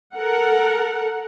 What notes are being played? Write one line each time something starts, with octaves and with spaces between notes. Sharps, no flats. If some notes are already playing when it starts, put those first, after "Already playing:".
A4 A#4 F#5